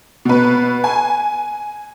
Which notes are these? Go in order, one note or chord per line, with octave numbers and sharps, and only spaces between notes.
B2 B4
G#5